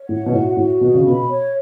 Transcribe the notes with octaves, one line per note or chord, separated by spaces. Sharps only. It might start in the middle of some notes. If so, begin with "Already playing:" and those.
Already playing: C#5
A2 F#5
B2
A2 F#4
A2 F#4
B2 G#4
C#3
B2 B5
C#5